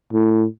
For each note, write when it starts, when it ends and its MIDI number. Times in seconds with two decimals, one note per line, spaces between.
0.13 0.45 45